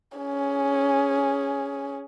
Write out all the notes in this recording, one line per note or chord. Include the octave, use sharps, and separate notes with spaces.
C#4 G#4